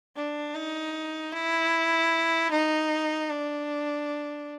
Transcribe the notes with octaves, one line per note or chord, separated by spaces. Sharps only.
D4
D#4
E4
D#4
D4